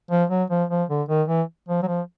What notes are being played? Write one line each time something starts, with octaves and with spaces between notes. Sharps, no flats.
F3
F#3
F3
F3
D3
D#3
E3
F3
F#3
F3